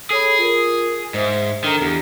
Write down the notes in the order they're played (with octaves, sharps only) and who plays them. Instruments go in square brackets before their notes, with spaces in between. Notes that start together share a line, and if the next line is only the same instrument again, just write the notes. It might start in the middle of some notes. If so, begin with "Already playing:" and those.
[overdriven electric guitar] G#4 [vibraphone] A4 C#5 B5
[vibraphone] F4 A#4
[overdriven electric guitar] G#2 [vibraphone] C5 E5
[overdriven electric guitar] D#3 [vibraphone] D4 A4 A#5
[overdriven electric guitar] E2 [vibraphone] D4 G4